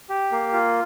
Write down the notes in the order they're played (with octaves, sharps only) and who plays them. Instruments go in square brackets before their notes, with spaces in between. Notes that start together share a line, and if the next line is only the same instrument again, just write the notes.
[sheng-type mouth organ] G4
A#3
F4